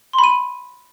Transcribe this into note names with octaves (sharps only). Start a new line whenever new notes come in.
C6
B5
D#7